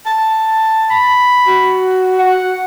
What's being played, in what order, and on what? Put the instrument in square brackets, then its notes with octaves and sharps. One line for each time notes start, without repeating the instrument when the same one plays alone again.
[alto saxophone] A5
[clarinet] B5
[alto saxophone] F#4
[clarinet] F#5